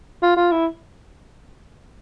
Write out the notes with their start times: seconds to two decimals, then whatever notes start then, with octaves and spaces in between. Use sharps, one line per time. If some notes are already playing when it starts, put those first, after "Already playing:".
0.22 F4
0.37 F4
0.51 E4